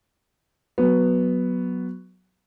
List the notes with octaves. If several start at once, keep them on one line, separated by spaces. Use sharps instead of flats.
F#3 B3